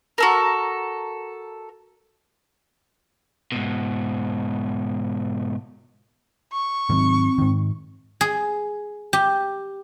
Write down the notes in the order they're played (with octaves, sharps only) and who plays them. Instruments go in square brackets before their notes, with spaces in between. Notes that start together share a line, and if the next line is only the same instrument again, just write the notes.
[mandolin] F#4 A4 A#4
[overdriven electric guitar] G#2 B2
[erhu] C#6
[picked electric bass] G#2 D#3 F#3 [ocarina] C4
[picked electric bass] G#2 D#3
[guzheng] G#4
G4